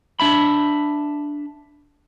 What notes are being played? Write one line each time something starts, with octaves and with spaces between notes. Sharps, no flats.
D4 E5 B5